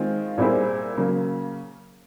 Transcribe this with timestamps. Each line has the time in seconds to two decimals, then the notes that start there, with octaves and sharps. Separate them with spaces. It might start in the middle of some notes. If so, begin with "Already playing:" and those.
Already playing: D#3 G#3 C4 F4
0.38 A#2 G3 C4 E4 G#4
0.97 C#3 F#3 A#3